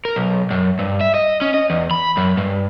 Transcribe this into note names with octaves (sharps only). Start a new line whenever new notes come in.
A#4
B1
F#2
G2
E5
D#5
C#4
D#5
E2
B5
F#2
G2